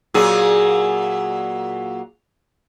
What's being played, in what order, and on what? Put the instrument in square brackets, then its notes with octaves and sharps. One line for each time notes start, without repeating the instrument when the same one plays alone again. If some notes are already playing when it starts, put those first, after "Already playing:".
[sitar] A#2 F#3 G#4